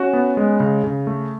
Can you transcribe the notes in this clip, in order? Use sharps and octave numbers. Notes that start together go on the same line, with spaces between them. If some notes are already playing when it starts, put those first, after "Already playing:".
Already playing: C#4 F#4
B3
G#3
C#3
C#3
A3